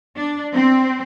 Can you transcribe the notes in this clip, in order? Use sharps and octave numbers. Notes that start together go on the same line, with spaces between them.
D4
C4